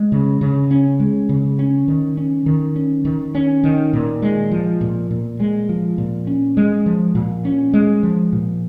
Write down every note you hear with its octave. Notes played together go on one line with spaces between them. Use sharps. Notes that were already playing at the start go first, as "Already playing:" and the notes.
Already playing: G#3
C#3
C#3
C#4
G#3
C#3
C#4
D#3
C#4
D#3
C#4
D#3
C#4
D#3
A#2
G#3
F3
A#2
A#2
G#3
F3
A#2
C#4
G#3
F3
A#2
C#4
G#3
F3
A#2